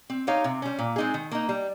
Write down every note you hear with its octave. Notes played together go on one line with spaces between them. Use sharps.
C4
D#4 G4 C#5 F5
C3
G3 C#4
A#2
G#3 C4 D#4 G#4
D#3
A#3 D#4
G3